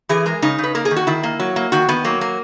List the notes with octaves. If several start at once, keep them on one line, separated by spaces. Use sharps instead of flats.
E3 G#4
G#3 A#4
C#3 D#4
C#3
B4
A#3 A#4
G#4
D#3
F#4
D#3 E4
A#3
F#3
A#3
D#3 F#4
D#3 B3
F#3 A#3
A#3